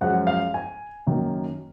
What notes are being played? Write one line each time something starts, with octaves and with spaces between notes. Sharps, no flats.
F#2 F3 G#3 F#5
F5
G#5
F#2 D#3 A#3